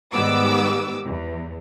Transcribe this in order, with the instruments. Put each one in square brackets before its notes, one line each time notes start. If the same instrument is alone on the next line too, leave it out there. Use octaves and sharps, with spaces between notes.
[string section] G#2 D#3 G3 B3 D6 E6
E2